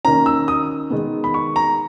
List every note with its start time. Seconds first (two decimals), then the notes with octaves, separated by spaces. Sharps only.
0.05 D#3 A#3 C#4 A#5
0.26 E6
0.48 D#6
0.90 D#3 G#3 B3
1.24 B5
1.34 C#6
1.56 A#5